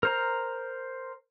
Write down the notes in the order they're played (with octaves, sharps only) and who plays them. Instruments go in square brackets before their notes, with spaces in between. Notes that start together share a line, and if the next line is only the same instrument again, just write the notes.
[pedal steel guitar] A#4 C5 A#5